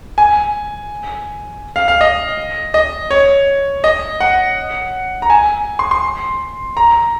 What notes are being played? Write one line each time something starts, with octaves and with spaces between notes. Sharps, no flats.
G#5
F5
F5
D#5
D#5
C#5
D#5
F#5
A#5
G#5
C6
C6
A#5